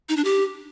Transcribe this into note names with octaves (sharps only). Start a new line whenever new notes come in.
D#4
D4
G4